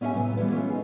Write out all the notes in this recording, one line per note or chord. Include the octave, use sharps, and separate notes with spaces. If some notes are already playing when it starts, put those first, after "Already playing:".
B3 C#4 E4 G4 E5 G#5
A2 C3 F#3 B3
E3 G3 G#3 B3
G#3 A3 B3 C#4 F4
D#4 F4 G#4